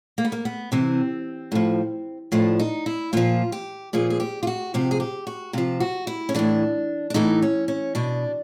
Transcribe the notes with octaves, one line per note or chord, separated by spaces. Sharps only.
A#3
B3
A#3
B3
C3 E3 C4
A2 F3
A2 F3 D4
D#4
E4
A#2 F3 F4
G4
A#2 F3 G#4
G#4
G4
F4
F#4
C3 F3 G4
G#4
G4
F#4
C3 F3 F4
F#4
E4
C#4
A2 E3 D4
D4
A2 E3 D#4
C#4
C#4
B2 D4